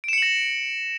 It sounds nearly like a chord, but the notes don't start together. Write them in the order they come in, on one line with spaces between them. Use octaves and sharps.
D7 E7 C#7 F#7 A#6